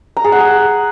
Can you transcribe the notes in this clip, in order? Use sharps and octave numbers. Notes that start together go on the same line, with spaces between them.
A#5
G#4
F#5
G#4